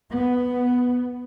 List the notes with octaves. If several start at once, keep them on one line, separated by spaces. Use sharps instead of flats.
B3